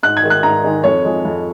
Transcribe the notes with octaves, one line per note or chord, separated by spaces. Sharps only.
G#2 F#6
G#6
D#3 G#3
F#6
G#2 A#5
D#3 G#3
F2 C#5
F3 G#3
F2